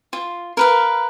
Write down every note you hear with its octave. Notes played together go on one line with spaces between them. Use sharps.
F4
A#4 B4 F5